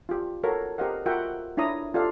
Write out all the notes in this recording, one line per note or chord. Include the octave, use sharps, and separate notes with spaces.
F4 G4
F#4 A4 A#4 C#5 F5
G4 A#4 C5 D#5 F5 F#5
F4 F#4 A#4 E5 F#5 G5
D4 E4 C#5 A#5 D#6
F4 G4 A4 D5 E5 F5